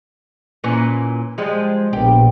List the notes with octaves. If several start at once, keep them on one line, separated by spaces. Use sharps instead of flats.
A#2 E3 C#4
F3 G3 G#3
A#1 B2 G4